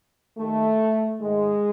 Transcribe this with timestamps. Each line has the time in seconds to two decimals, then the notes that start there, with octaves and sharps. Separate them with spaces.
0.38 D#2 D#3 A3
1.20 G#2 D#3 G#3